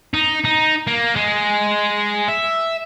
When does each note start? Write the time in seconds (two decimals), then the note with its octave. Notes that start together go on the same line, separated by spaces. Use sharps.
0.14 D#4
0.45 D#4
0.87 A#3
1.16 G#3
2.28 E5